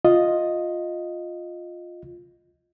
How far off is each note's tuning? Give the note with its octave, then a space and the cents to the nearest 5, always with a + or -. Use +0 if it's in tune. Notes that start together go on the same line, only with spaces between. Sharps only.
F4 +10 D#5 +0